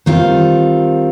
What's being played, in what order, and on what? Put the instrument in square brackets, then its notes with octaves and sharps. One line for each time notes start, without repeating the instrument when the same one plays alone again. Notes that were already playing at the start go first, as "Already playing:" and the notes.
[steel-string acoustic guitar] D#3 G3 C4 F4